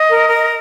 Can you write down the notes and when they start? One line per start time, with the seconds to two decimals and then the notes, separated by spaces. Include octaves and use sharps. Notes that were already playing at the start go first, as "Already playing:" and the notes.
Already playing: D#5
0.10 A#4
0.29 A#4